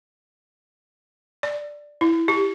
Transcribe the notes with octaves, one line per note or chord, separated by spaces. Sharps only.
D5
E4
G4